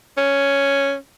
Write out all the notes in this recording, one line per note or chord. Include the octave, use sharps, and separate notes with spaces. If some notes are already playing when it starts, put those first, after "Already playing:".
C#4